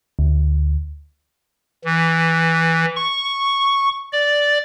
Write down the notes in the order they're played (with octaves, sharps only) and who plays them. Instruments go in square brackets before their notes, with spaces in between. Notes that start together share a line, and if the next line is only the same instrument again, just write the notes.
[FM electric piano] D2
[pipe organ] E3
C#6
D5